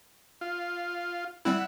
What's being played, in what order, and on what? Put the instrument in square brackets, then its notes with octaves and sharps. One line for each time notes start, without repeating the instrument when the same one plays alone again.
[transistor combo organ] F4
[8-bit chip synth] G3 C4 E4 [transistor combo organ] E5 F#5